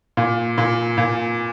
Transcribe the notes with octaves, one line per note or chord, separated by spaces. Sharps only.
A#2
A#2
A#2